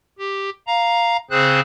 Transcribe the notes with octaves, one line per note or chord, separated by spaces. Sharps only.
G4
F5 A#5
C#3 C4 G#4 C5 F#6